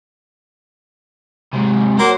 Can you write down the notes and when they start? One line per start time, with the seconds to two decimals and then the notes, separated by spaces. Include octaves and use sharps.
1.53 G#2 C3
1.99 F#3 A#3 C5